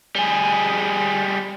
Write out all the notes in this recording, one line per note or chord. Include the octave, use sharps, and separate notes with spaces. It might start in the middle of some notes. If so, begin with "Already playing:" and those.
G3 G#4